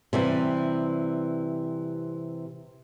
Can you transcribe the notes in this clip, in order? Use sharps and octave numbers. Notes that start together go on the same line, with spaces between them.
C3 E3 G3